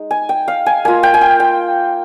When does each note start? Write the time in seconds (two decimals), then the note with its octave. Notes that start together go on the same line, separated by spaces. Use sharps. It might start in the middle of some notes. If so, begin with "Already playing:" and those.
Already playing: G#3 D#4
0.11 G#5
0.29 G5
0.48 F5
0.66 G#5
0.85 A#3 F4 G#5
1.03 G5
1.14 G#5
1.21 G5
1.40 G5